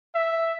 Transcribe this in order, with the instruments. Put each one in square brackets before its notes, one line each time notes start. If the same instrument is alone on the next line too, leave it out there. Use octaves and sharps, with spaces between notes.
[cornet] E5